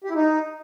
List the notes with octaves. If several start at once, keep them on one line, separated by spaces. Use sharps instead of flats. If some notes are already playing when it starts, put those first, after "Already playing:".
G4
E4
D#4